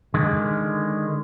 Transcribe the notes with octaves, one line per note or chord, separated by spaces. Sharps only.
D3 D#3 G#3